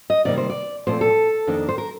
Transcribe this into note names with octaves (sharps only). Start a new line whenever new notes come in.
D#5
C3 D#3 G3 A#3 D5
C5
D5
A#2 F3 A3 C4 C5
A4
F2 D#3 A#3 D4
C5
A#4